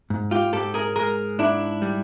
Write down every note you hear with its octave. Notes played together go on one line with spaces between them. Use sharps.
G#2
F4 G4
G#2 G4 A4
G#4 A#4
G#3 G#4 A#4
G#2 D4 E4
G3